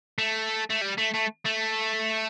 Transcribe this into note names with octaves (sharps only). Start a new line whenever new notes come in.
A3
A3
G3
A3
A3
A3